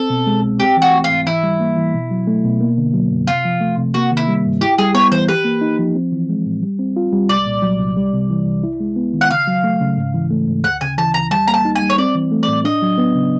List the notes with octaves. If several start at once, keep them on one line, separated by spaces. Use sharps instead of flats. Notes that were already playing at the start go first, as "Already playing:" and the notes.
Already playing: C4 A4
B2
G#3
C2
C4 G4
E3 F#4
A3
F4
G#2
E3 E4
G3
A#3
E3
B2
F#3
A3
B2
A#3
D3
F#3
F#2
C3 F4
F3
A3
C3
A#3 F#4
D#3
E4
G3
G2
E4 G4
G3 G#4
B3 C#5
E3 C5
G4 B4
A#3
D#4
F3
C4
E3
G#3
A2
G3
C4
F4
G3
C2 D5
A#2
F#3
C2
G3
C3
E3
C2
E4
G#3
B3
D#3
F#5
C#3 F5
F#3
A3
C#3
G#2
E3
A3
G#2
D2 F#5
C#3 G#5
E3 A5
D2 A#5
G3 A5
A#3 A#5
A5
D#4
G#5
G3
C#5
C4 D5
E3
A3
A2 D5
D4 D#5
F#3
B3
C#3